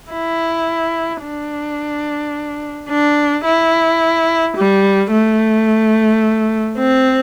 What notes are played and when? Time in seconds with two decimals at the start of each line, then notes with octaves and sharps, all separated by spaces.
0.12 E4
1.23 D4
2.89 D4
3.45 E4
4.56 G3
5.11 A3
6.78 C4